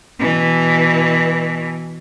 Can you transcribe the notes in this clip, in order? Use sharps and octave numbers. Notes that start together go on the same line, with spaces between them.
B2 E3